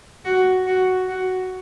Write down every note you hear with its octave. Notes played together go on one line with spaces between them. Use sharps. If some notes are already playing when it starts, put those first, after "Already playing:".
F#4
F#4
F#4